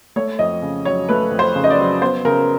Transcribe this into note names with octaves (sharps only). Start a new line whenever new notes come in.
A3 C#5
F2 D#5
C#3
F#3 C#5
A3 B4
F2
C5
C#3
D#5
D5
F#3
B3 C5
C#3 A#4